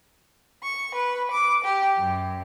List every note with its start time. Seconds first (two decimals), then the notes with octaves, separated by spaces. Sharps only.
0.63 C#6
0.94 B4
1.31 D6
1.64 G4
1.97 F#2